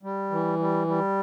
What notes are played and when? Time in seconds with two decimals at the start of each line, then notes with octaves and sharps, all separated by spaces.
0.03 G3
0.31 E3
0.59 G3
0.87 G3